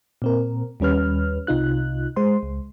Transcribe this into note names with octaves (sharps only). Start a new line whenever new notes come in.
A#2 C4 A#4
D#2 G3 C#4 B4 F6
C2 C3 D#4 F4 F#6
G#3 C5 C6
C#2